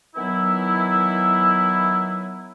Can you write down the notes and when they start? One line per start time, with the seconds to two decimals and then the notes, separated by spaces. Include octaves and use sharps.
0.16 D#3 E3 F#3 B3 E4